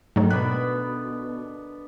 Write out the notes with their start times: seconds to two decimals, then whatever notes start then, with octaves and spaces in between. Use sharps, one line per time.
0.16 G#2 D3 D#3 F#3 A3
0.30 B2 B3 D5 B5 F#6